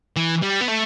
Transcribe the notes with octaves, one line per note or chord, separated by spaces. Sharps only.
E3
G3
B3
A3